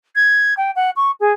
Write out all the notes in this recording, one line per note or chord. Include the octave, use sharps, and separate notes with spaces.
G#6
G5
F#5
C#6
G#4